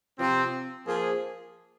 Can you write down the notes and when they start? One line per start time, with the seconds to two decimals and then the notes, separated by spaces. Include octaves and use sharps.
0.19 C3 F3 C4
0.86 F3 A#3 G#4